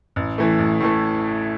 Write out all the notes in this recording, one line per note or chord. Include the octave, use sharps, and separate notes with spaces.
A1
A2 E3 A3
A1
A2 E3 A3